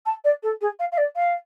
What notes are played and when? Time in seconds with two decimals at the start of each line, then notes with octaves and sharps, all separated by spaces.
0.05 A5
0.24 D5
0.42 A4
0.61 G#4
0.79 F5
0.92 F5
0.97 D5
1.15 F5